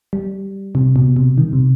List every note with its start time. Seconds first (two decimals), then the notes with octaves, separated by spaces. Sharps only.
0.13 G3
0.75 C3
0.96 B2
1.16 C3
1.38 D#3
1.53 C3